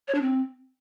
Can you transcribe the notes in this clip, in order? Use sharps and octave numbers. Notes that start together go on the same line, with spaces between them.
C#5
D4
C4